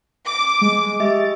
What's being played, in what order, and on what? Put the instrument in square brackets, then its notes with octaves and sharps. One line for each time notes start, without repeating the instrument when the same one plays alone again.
[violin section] D6
[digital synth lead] G#3
[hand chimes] G4 D#5 E5 [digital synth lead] A6